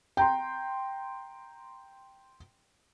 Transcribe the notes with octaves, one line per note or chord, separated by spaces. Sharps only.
G5 A#5 C6